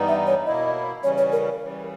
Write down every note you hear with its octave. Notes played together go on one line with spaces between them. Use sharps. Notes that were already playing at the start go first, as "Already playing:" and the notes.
Already playing: G2 E3 G3 B3 D#4
E5
C#5
B2 A#3 E4 D#5
C#3 E3 G3 C#4 C#5
C#5
A#4
C#3 E3 G3